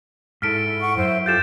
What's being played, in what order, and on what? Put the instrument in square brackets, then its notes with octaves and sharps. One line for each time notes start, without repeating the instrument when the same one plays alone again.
[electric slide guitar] G#2 A4 [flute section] E4 [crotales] F6 B6 D7
[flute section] F#5 C#6
[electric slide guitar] F#2 [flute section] E4 C5 E5
[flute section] F4 G4 A4 [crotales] G6 A6 E7